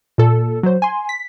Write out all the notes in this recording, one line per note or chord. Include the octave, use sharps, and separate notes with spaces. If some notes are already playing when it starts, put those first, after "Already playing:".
A#2 A4
F#3 C5
G#5 C6
B6